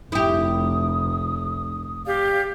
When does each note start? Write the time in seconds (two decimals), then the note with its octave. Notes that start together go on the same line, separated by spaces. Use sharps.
0.12 F1 E4 G4 D#6
2.05 G4 D5 F5